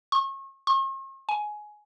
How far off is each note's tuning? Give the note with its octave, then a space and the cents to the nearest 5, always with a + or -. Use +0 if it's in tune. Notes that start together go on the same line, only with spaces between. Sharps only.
C#6 -35
C#6 -45
G#5 +15